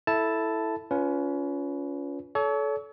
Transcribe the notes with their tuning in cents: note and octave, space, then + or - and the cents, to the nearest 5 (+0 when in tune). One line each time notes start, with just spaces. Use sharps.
E4 +0 A4 +0 A5 +0
C#4 +25 F4 +0 B4 +0
A4 -25 C#5 +35